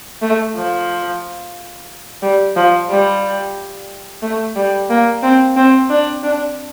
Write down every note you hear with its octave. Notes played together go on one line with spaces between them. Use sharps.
A3
F3
G3
F3
G3
A3
G3
A#3
C4
C4
D4
D4